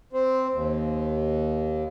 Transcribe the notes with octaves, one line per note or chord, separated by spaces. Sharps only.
C4
D#2